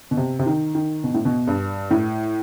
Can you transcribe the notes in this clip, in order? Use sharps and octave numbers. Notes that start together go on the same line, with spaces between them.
B2
C3
C3
D#3
D#3
B2
A2
B2
G2
A2